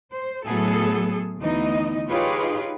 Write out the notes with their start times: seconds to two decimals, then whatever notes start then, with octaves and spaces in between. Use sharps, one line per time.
0.13 C5
0.45 A2 F#3 A3 B3 G#4 A4
1.41 D2 E3 B3 D#4 D#5
2.09 D#4 F4 G4 G#4 B4 C#5